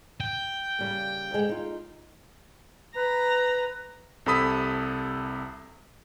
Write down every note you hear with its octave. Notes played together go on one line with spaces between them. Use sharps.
G5
C#3 G3 A#3
D2 G#3
D#4 F4
B4 A#5
C2 C3 A4 B5 D#6 B6